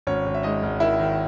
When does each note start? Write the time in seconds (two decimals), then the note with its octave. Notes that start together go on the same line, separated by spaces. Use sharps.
0.07 G#1 C#4 C#5
0.26 G#1
0.34 E5
0.43 G#3 D#4 D#5
0.63 G#1
0.80 D#3 E4 E5
0.99 D#3